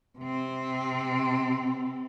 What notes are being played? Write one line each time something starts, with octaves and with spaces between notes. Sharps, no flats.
C3 C4